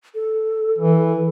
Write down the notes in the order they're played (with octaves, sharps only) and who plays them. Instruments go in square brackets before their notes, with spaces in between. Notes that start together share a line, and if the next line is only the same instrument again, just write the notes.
[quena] A4
[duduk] E3